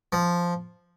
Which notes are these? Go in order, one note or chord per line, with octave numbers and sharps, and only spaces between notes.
F3